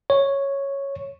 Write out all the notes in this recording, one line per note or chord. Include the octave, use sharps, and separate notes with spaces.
C#5